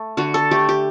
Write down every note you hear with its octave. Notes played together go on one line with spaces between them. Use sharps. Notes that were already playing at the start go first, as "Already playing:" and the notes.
Already playing: A3
D3 F#4
A4
A3 G4
G4